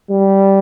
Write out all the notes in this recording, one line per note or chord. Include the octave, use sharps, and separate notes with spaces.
G3